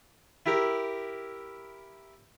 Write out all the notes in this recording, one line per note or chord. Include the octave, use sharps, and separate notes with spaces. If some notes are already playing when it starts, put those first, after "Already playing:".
E4 G4 A#4